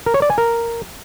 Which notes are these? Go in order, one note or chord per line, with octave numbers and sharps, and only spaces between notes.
A#4
C#5
D5
G#5
A#4